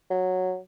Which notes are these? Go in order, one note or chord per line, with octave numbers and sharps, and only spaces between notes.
F#3